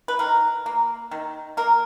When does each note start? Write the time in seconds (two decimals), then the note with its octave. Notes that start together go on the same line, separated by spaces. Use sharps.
0.08 B4
0.19 D#3 A#4
0.66 A#3
1.11 D#3
1.57 A#3 A#4